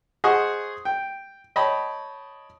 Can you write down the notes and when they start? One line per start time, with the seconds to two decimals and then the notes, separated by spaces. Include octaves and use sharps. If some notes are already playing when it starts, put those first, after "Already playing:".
0.24 G#4 C5 D#5 F#5 C#6 D#6
0.85 G5
1.56 C#5 D#5 G5 A5 B5